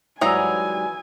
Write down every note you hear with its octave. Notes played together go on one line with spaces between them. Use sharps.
G#2 E3 F#3 G3 G#5 A#5 D#6 E6